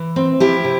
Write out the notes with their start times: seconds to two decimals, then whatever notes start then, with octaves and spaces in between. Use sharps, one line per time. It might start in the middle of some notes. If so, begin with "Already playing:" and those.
Already playing: E3
0.16 C4
0.40 F3 E4 G4
0.64 C3